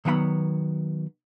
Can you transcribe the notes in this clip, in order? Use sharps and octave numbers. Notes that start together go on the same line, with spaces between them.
D#3 F#3 B3 F5 B5